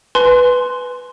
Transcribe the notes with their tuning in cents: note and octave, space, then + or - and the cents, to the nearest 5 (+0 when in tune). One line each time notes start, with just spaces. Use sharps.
B4 +0 G#5 +25 C6 +0